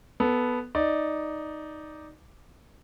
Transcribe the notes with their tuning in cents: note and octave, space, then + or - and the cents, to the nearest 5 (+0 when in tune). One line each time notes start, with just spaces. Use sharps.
B3 +0 A4 -10
D#4 +0 D5 +0